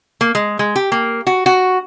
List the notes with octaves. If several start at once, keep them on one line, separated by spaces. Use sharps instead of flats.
A#3
G#3
G#3
G4
A#3
F#4
F#4